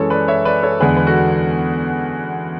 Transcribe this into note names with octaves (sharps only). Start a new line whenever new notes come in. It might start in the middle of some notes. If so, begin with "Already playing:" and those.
Already playing: F#2 E3 G#3 A4 C#5
B4 D5
C#5 E5
B4 D5
A4 C#5
E2 D3 G#3 G#4 B4
B4
F#4 A4